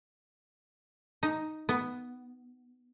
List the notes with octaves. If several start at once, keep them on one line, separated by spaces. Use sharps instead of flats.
D#4
B3